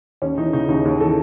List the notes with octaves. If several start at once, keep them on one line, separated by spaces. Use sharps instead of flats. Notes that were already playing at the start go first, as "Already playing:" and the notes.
D#2 C#4
E3 D#4
C#3 D#4
D#2 D#4
D#2
E3 A4